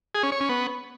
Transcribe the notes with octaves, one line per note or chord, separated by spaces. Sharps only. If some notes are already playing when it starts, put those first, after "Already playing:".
G#4
C#4
C#5
C#4
B3